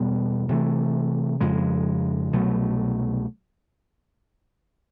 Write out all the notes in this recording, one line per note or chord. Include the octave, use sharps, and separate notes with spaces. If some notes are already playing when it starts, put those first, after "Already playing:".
Already playing: E2 B2 G3 B3
C3 E3 A3
F2 C#3 F3 G#3
C2 B2 F#3 A3